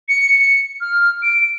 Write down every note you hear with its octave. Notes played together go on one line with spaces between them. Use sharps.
C#7
F6
D7